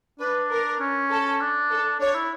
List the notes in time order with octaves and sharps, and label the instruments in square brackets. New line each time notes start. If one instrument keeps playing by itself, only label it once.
[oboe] D4 [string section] B4
[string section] A#4
[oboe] C#4
[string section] A4
[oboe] D4
[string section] A4
[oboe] D4 [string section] C#5
[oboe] E4